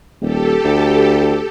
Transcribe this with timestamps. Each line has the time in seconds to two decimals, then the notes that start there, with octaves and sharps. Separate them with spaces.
0.22 D#1 G4 A4
0.64 D2